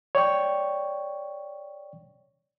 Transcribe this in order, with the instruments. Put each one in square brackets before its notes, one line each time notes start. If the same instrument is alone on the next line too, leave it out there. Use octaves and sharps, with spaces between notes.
[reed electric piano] C#5 D5 G5 C#6